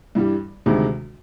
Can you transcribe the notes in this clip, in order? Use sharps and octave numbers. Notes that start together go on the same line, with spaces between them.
G2 E3 G3
D2 C3 D#3 G#3